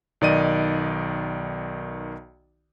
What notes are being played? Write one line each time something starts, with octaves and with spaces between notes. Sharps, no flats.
B1 D#3 D5 D#5 D#7